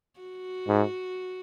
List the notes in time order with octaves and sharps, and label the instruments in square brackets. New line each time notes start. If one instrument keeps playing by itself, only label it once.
[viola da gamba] F#4
[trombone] G#2